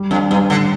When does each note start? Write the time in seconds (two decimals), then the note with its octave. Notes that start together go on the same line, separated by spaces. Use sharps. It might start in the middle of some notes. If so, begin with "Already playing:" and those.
Already playing: G3
0.11 F2 D4
0.30 G2 G3
0.50 A2 D3